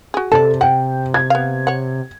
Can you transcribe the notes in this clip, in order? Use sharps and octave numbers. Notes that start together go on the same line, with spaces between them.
F#4 G#4
C3 A4 D5 A5
F#5 G5
G#6
B3 F5
C#5 F#5